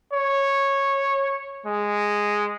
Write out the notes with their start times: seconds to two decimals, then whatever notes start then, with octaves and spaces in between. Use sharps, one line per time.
0.13 C#5
1.66 G#3